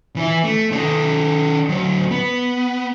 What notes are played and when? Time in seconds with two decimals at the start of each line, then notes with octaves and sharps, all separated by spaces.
0.16 E3 E4
0.44 A3
0.71 D#3 A4
1.69 D2 F#3
2.11 B3